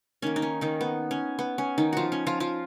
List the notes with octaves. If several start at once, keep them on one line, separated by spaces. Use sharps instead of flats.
D#3 A#3 C#4
D#4
C#4
D#3 D#4
B3
C#4
B3
C#4
D#3 D#4
F3 F4 F#4
C#4
F3 F4
F3 F4